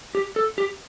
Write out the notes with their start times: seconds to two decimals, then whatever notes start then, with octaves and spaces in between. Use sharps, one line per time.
0.15 G4
0.36 A4
0.58 G4